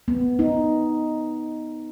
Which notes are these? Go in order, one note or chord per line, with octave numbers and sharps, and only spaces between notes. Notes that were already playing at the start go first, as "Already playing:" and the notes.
B3
D#4